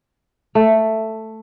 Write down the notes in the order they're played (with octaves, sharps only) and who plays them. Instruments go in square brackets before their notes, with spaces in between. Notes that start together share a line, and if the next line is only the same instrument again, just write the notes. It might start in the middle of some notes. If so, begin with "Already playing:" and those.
[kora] A3